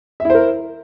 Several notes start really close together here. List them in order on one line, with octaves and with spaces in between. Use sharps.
E5 E4 C5 A#4